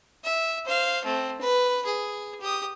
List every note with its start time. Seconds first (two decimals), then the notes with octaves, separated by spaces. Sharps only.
0.24 E5
0.66 C5 F5
1.05 A3 C4
1.41 B4
1.85 G#4
2.40 G4 D#6